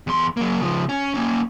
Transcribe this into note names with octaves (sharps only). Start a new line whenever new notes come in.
E2 C6
F#3 A#3
C#3 F3
C#4
A#3 C#4